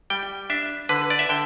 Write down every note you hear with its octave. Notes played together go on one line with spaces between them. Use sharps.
G3 G5
D4 E5
D3 B4
D5
E5
D3 G5